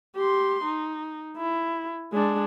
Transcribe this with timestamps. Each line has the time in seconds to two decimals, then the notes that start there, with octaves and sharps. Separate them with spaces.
0.16 G4 C6
0.64 D#4
1.37 E4
2.13 G#3 D4